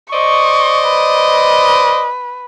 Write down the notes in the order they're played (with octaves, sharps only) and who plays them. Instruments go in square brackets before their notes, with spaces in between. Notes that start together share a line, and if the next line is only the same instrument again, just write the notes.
[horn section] C5 D5 D#5 [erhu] C#6
[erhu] B4